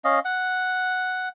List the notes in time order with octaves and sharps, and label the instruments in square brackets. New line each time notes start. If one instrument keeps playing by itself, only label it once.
[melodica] C#4 D#5 F5
F#5